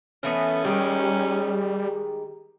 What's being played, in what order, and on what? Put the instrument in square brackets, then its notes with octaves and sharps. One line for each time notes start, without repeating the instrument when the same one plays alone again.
[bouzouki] E3 A3 B3 [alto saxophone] C#4
[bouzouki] D#3 G#3 G4 [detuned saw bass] G3